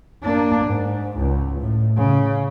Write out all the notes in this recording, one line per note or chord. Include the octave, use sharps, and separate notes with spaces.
A#3 D4
G#2
C#2
A2
C#3